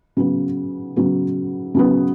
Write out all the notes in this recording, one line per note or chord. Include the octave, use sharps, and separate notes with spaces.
C#3 F#3 B3
C#3 F#3 B3
C#3 F#3 B3